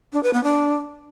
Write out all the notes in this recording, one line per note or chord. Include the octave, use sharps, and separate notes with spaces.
D4
B4
B3
D4